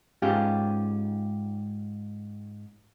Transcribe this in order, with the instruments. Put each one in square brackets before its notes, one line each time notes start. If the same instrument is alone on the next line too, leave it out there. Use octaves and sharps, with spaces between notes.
[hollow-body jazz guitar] G#2 C#4 F4 G4